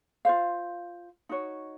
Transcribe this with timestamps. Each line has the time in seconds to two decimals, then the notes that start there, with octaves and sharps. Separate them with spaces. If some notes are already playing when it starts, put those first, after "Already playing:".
0.25 F4 C5 F5
1.29 D#4 F#4 C#5